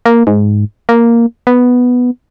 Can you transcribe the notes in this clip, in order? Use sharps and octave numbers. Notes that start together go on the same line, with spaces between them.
A#3
G#2
A#3
B3